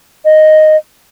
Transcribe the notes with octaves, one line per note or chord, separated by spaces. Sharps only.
D#5